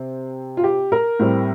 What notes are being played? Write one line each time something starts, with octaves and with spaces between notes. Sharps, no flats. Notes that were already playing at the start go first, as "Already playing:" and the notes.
Already playing: C3 C4
F4
G4
A#4
A2 G3 C4